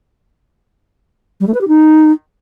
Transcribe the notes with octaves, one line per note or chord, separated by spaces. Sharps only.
G3
A3
B4
G4
D#4